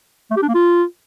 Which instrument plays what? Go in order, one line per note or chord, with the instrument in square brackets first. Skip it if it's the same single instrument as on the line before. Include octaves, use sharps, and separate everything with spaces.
[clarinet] A3
G4
D4
A#3
F4